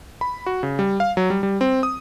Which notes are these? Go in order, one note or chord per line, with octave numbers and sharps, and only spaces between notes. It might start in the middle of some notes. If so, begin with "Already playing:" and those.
B5
F#4
C#3
G3
F5
F#3
G3
G3
C4
D#6